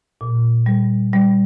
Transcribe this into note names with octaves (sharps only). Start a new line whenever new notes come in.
A#2
G3
G3